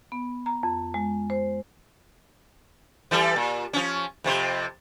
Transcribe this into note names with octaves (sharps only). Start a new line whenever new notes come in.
B3
A#5
F2
G#3
C5
E3 G3 A4
A#2
F3 C#4
F2 C3 C5